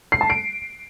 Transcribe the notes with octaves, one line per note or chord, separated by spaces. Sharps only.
C7
A5
D7